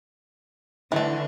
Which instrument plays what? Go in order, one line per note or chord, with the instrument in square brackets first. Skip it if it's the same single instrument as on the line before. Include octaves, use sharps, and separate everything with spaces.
[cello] D3 [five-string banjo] E3 A3